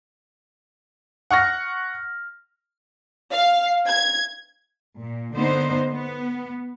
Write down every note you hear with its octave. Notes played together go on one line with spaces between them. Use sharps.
F#5 C#6 F6 A#6
F5
G#6
A#2
D3 A#3 B3 D#4 C5
B3